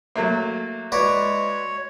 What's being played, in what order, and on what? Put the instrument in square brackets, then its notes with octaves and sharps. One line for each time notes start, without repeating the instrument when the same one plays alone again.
[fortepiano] F#3 A3 A#3
[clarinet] G#3 [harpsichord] F#4 B4 D5 [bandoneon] C#5